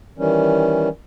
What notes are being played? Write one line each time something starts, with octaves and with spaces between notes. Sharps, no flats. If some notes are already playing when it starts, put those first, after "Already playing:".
D#3 E3 G3 C#4